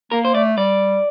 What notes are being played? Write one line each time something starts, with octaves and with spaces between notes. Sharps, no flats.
A#3 A#4
C5
A3 D5
G3 D5